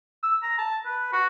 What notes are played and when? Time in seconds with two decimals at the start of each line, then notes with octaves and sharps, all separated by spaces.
0.23 E6
0.43 A#5
0.58 A5
0.86 B4
1.13 F#4